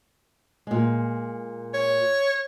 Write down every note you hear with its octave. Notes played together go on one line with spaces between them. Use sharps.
A#2 G#3
C#5